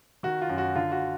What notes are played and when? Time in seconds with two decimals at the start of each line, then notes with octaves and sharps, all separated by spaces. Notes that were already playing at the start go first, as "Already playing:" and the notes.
0.23 D#3 F#4
0.41 F4
0.49 F#2
0.58 F#4
0.75 D3 F4
0.92 F#4